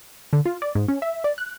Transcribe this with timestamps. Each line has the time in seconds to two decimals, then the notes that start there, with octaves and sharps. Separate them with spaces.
0.33 D3
0.46 F4
0.62 D5
0.75 G#2
0.88 C#4
1.02 E5
1.24 D5
1.38 F#6